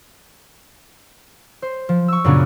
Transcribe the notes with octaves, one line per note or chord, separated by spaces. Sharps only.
C5
F3
C#6 E6
F#2 A#2 C#3 B3 C#4 D4